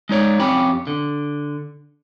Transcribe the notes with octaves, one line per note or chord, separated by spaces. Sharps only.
G#3 D#4 C#5 D5
F2 C#4 G4 B5
D3